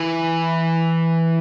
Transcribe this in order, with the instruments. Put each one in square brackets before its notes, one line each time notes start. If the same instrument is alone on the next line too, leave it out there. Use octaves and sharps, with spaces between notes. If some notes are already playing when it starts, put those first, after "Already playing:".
Already playing: [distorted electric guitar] E3